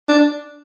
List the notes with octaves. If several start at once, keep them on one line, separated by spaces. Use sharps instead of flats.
D4